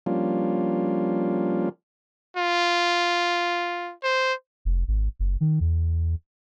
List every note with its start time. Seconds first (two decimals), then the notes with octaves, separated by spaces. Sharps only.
0.06 F3 G3 A#3 C#4 D4 F4
2.37 F4
4.03 C5
4.65 F1
4.88 G#1
5.19 F#1
5.41 D#3
5.61 E2